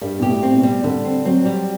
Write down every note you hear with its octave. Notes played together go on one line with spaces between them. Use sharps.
G2 G3
B2 G4
A2
C4
B2
G3
D3 G3
C4
F#3 C4
G3